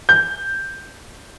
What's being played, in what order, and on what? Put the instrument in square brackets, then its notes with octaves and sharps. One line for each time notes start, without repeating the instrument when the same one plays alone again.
[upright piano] G6